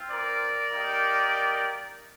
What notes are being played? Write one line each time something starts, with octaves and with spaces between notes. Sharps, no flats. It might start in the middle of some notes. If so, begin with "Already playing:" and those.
Already playing: C4 F4
A#4 D5
A#3 D#4 G4